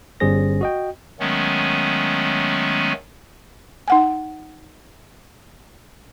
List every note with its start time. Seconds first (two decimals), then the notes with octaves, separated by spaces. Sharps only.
0.20 G1 G3 C#4 G#4 C5 A#6
0.61 F#4 D#5 G5
1.20 D#3 F#3 G#3 A3 B3 C#4
3.88 D#4 F#5 G#5